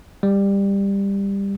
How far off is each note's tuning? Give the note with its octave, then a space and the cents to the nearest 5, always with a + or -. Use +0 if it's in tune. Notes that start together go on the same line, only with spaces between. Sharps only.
G3 +15